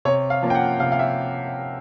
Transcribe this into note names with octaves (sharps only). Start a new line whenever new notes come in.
C3 C#5
F5
F3 A#3 C#4
G5
F#5
C3 F5
F5
E5